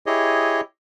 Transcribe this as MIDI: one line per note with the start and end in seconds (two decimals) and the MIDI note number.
0.06 0.61 64
0.06 0.61 67
0.06 0.61 68
0.06 0.61 73
0.06 0.61 75